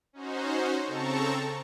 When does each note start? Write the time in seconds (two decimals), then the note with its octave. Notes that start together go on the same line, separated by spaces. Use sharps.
0.13 C#4 D#4 F#4 C5
0.83 C#3 C4 A4 A5 A#5 C#6